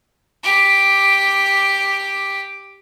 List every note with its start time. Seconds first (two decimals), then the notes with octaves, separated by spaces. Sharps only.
0.44 G4 D6